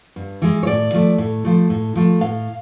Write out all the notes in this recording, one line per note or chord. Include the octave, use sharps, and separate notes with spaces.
G2
E3 G#3
C#5
A2 D5
F3 A3
A2
F3 A3
A2
F3 A3
A2 F5